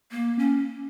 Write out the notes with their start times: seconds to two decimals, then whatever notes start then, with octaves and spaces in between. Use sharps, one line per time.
0.11 A#3
0.39 C#4